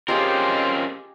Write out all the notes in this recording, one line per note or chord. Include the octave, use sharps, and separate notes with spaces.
C4 C#4 F4 G4 G#4 A#4 D#5